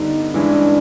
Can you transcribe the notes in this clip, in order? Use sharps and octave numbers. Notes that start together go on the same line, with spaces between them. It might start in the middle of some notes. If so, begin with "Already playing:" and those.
Already playing: G2 D3 G3 B3 D#4
G2 E3 G#3 C#4 D4 E4